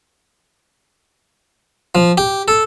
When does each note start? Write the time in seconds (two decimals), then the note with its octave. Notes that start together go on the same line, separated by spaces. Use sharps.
1.95 F3
2.18 G4
2.48 A4